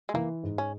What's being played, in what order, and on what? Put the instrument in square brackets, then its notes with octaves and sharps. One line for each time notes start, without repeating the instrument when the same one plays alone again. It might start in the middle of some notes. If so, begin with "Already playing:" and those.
[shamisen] G#3
[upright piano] E3 [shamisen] A#3
[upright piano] G#2
[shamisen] C#4